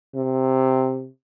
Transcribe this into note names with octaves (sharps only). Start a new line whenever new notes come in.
C3